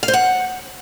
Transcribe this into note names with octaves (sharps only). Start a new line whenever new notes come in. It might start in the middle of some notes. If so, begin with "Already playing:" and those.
F5
C5
F#5